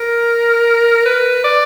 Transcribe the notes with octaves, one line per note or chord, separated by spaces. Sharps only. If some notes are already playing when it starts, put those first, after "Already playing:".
Already playing: A#4
B4
D5